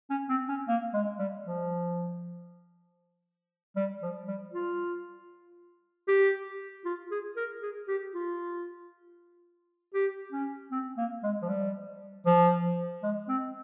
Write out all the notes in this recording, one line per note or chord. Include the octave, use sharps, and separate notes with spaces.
C#4
C4
C#4
A#3
G#3
G3
F3
G3
F3
G3
F4
G4
F4
G#4
A#4
G#4
G4
F4
G4
C#4
C4
A#3
G#3
F3
G3
F3
G#3
C4